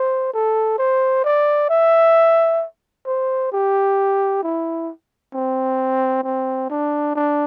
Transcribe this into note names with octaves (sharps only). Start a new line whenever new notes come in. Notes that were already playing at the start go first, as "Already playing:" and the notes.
Already playing: C5
A4
C5
D5
E5
C5
G4
E4
C4
C4
D4
D4